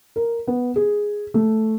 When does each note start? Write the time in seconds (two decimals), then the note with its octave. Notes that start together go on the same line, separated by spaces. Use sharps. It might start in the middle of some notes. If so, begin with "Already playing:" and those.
0.16 A#4
0.47 B3
0.76 G#4
1.34 A3